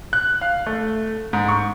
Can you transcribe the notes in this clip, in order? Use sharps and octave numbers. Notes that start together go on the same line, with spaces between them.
F#6
F5
A3
G#2
C#6